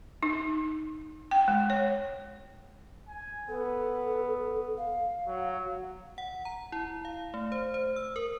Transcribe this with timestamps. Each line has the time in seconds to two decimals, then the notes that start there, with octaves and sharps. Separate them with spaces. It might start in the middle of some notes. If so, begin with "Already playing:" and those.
0.23 D#4
1.31 G5
1.48 G#3
1.70 C#5
3.08 G#5
3.48 B3 A4
4.78 F5
5.27 F#3
6.18 F#5
6.45 A#5
6.72 E4
7.05 F5
7.34 A3
7.52 C5
7.74 C5
7.96 E6
8.16 A#4